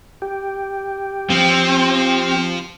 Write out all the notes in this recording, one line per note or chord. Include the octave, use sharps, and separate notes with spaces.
G4
F3 C4